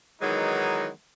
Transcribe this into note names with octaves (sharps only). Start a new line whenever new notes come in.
D#3 E3 F#3 G#3 B3 D#4